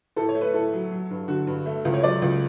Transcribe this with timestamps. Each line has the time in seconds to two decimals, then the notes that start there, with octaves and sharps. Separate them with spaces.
0.16 A2 A4
0.29 C#5
0.35 A3
0.41 B4
0.54 A2 A4
0.73 F#3
0.91 F#3
1.10 G2
1.28 D3 F#4
1.47 G2
1.66 A3
1.85 C#2
1.93 C#5
2.03 F#3 D5
2.22 C#2